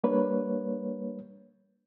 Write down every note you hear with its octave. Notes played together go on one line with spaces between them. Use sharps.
G3 A#3 D4 B4 C#5